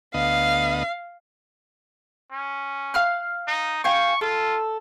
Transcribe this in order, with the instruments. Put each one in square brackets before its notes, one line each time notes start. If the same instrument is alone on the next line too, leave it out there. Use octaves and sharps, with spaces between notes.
[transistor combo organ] D2 B3 D#5 [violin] F5
[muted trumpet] C#4
[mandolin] F5 F6 F#6
[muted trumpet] D#4
[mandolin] F5 G5 G#5 [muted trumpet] C#6
[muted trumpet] F4 [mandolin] A4